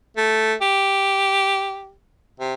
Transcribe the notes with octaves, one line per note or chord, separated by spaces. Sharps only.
A3
G4
C3